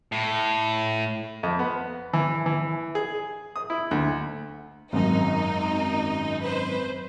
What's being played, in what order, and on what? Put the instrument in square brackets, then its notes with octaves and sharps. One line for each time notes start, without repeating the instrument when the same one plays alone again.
[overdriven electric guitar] A2
[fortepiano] F2
B3
E3
E3
G#4
D#6
E4
D2
[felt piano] G#1 F#2 [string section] D#4
[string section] B4 C5